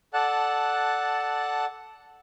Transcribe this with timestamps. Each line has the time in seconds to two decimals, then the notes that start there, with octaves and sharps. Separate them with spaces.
0.14 A4 D5 F#5 A5 F#6